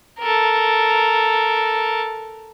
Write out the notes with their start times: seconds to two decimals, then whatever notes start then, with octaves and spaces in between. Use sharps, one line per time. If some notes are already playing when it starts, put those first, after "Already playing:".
0.19 A4 A#4